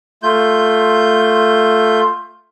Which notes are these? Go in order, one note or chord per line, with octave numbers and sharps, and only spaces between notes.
A3 F4 G6